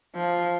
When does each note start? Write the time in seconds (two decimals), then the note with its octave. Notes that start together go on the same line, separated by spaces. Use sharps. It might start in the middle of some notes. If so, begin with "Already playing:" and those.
0.15 F3